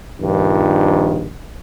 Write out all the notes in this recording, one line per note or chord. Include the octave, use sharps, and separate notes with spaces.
A#1 G2 D#3 F3